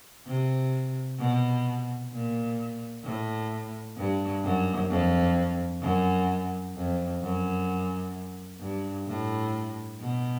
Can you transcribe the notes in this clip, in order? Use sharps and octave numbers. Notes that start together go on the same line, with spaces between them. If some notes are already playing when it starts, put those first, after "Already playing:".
C3
B2
A#2
A2
G2
F#2
F2
F#2
F2
F#2
G2
A2
B2